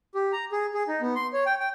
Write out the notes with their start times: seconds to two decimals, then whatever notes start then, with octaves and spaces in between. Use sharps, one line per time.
0.15 G4
0.33 A#5
0.52 G#4
0.74 G#4
0.88 D#4
1.01 B3
1.15 C6
1.33 C#5
1.46 G5
1.60 G5